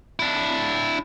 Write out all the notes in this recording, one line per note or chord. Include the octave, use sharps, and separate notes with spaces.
D4 E4